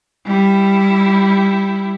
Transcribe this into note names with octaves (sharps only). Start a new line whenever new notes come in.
G3 E4